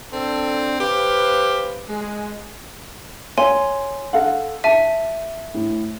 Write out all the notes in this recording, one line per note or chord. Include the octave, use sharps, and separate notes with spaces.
C4 D4 A4
G4 B4 C5 F5
G#3
C#5 G#5 C6
A4 F5 F#5
E5 A5 D#7
A2